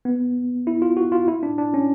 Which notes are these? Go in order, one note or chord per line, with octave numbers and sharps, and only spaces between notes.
B3
E4
F4
F#4
F4
E4
D4
D4
C#4